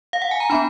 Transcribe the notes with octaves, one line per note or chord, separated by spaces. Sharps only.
F5
F#5
G#5
A#5
B3 D4 B5